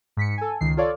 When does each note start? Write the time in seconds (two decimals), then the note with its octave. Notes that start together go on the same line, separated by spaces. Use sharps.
0.17 G#2 B6 C#7
0.38 A4 G#5
0.61 C#2 D#3 C7
0.77 F4 A4 C#5 D5 F5